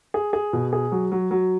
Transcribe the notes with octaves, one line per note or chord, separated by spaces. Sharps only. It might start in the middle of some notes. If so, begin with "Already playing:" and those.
G#4
G#4
B2
G#4
F#3
F#3
F#3